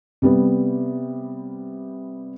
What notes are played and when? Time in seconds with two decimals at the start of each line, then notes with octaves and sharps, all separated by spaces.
0.22 C3 G3 B3